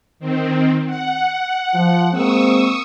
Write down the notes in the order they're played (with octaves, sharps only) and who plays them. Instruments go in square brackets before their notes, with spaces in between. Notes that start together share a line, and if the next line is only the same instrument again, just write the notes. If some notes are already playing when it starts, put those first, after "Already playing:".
[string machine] D#3 C4
F#5
[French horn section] F3
[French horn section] G#3 A#3 C4 [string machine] C#6 D#6 E6